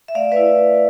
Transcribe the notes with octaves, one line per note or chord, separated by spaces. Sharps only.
E5
A3 D5 F5
B4 D5
E4